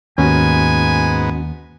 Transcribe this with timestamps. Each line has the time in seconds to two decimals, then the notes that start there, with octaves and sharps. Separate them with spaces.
0.18 D#2 G#2 B3 C#4 F#4 G#5